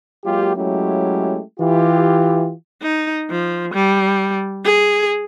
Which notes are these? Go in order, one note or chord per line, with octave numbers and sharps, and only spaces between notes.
F#3 G#3 A#3 F4 G4
F#3 G#3 A3 C#4 E4 G4
E3 F4 G4
D#4
F3
G3
G#4